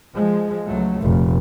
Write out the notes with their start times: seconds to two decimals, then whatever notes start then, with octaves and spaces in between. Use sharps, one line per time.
0.14 F3 G#3
0.67 C#2 F#3 A3
1.03 F1 A#2